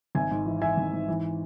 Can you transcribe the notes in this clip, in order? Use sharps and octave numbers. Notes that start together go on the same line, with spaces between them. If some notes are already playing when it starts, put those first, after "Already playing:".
G#1 E5 G#5
G#2
E3
E3 E5 G#5
G#1
G#2
E3